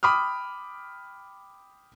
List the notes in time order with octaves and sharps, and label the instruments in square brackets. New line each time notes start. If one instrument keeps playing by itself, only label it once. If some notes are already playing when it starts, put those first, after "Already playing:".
[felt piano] G5 B5 D6 D#6 F6